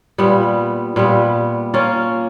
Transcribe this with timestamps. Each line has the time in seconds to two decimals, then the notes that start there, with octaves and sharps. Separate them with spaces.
0.18 A#2 G3 B3
0.96 A#2 G3 B3
1.74 A#3 C#4 F4